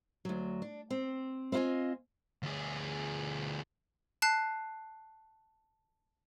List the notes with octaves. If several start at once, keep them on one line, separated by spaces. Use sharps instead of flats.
D2 F#3
D4
C4
C4 E4 F4 D#5 G#5
D2 G#4
A5 F#6 C7